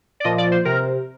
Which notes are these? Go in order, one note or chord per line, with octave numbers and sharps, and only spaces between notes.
D5
A#2 F3 D#5
D5
C5
C3 A#4